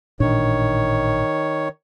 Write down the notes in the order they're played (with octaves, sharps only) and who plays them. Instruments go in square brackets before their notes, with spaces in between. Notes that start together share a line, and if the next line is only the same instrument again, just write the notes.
[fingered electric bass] A1 A#2 D4 [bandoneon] D#3 C#5